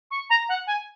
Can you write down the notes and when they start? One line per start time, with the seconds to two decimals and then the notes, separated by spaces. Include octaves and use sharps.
0.11 C#6
0.30 A#5
0.49 F#5
0.67 G#5